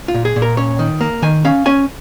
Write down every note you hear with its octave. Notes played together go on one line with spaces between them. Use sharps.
F4
A#2
G#4
A#2
A#4
C#4 C#5
D#3
A#3
D#3 G#5
C#4 F5
C#4 G#5